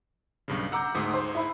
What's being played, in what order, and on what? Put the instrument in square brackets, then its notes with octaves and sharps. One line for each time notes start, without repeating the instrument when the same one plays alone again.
[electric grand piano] B1 G2 C#3
[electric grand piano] F#5 D6 G6 [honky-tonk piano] A#5 E6
[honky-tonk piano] D2 D#6 [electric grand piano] G#2 G#3
[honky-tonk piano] C5
E4 B5